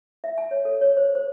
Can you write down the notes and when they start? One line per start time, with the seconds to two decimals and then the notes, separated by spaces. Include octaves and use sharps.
0.24 E5
0.38 G#5
0.51 C#5
0.65 A4
0.81 C#5
0.97 C5
1.15 C5